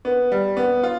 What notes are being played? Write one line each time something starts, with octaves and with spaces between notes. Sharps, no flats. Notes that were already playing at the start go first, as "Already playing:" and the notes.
B3
G3
B3
F4